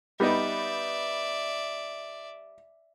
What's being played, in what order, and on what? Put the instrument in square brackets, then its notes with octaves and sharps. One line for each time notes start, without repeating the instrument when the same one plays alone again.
[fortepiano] G3 B3 D#4 [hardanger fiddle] D5 E5